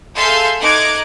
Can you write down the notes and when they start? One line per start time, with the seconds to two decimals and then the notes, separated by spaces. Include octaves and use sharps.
0.15 G#4 A4 E5 F5 C6 G6
0.60 D#4 D6 F#6 G#6